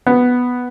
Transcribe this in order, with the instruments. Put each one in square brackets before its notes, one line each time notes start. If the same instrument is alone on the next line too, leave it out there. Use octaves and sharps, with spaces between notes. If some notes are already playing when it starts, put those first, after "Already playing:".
[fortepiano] B3